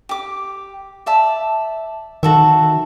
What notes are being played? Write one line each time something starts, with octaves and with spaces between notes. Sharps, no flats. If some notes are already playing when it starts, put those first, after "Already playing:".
G4 D6
D5 E5 A5
D#3 F#4 A4 E5